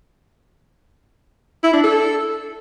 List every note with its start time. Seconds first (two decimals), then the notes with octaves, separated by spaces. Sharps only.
1.63 E4
1.73 D4
1.83 A4